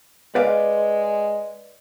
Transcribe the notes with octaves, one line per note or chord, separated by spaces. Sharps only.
G#3 B4 D5 F5